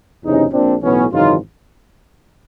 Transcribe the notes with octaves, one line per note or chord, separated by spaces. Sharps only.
F#1 E2 C3 C#4 D#4
A#1 A#2 C4 D4
B1 A2 E3 B3 C#4
G#1 F#2 C#3 E3 D#4 F4